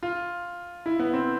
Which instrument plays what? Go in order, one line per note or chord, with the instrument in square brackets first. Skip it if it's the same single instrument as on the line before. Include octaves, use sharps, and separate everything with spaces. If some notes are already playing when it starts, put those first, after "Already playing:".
[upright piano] F4
E4
B3
C4